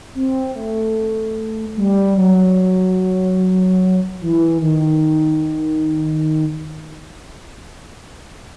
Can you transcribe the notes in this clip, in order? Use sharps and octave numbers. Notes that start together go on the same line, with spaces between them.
C4
A3
G3
F#3
E3
D#3